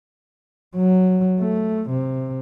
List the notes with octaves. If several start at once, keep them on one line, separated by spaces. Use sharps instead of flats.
F#3
A3
C3